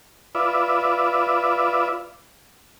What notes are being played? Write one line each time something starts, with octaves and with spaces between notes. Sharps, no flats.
F4 B4 D5 E5